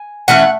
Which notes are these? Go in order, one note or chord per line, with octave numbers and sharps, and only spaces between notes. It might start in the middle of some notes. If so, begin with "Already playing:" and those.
Already playing: G#5
E3 A3 C#4 F#5